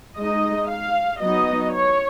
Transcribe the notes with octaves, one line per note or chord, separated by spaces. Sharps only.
G#3 D#4 D#5
F5
F#3 B3 D#4 D#5
C#5